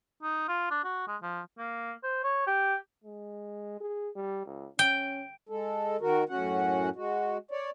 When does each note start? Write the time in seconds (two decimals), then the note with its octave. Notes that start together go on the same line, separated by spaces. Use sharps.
0.23 D#4
0.48 F4
0.71 D4
0.85 F#4
1.08 G#3
1.22 F3
1.58 A#3
2.03 C5
2.23 C#5
2.47 G4
3.04 G#3
3.81 G#4
4.16 G3
4.46 C#2
4.79 C#4 G5
5.49 G#3 A4
6.01 D#3 F#4 A#4
6.29 F#2 A2 C#4 F#4 F#5
6.96 G#3 F#4
7.51 C#5 D5